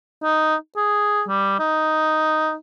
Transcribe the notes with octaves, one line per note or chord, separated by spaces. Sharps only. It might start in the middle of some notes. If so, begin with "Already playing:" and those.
D#4
G#4
G3
D#4